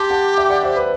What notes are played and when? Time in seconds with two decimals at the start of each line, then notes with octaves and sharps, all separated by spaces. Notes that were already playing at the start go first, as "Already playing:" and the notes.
Already playing: G4 A5 C6
0.10 F#5 A5
0.37 E5 G5
0.50 D5 F#5
0.63 C5 E5
0.76 B4